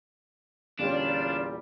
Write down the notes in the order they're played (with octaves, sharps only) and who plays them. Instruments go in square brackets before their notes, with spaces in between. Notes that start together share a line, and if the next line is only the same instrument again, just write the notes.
[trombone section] E2 A#2 G3 [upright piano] D3 C#4 [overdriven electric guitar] D4 [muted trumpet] F4